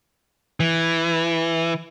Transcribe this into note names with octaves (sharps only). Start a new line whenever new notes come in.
E3